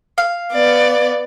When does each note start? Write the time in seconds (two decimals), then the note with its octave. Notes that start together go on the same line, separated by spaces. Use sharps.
0.18 F5
0.53 B3 D5